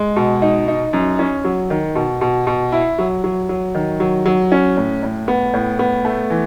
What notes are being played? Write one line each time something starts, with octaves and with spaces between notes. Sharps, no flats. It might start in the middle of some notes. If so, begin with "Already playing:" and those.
Already playing: G#3
B2
D#4
D#4
F#2
C#4
F#3
D#3
B2
B2
B2
E4
F#3
F#3
F#3
D#3
F#3
F#3
C#4
A2
A2
B3
A2
B3
A3
E3